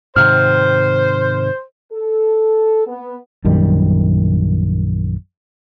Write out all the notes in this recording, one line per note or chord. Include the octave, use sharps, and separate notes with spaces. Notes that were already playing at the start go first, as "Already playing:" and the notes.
G#2 C3 D#3 C5 F6
A4
B3
A#1 F#2 D#3 G3